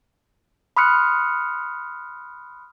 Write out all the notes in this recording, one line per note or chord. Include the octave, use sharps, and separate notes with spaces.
B5 C6 D#6 F6 F#6 C#7